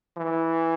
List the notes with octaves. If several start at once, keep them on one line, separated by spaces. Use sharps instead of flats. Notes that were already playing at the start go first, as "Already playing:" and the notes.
E3